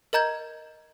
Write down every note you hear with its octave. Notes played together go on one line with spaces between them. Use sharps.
A#4 D#5 A#5 G6 G#6